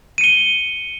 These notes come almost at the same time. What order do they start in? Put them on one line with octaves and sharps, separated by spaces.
D#7 C#7 G7